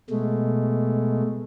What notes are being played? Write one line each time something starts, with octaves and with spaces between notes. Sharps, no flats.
B2 G#3 A3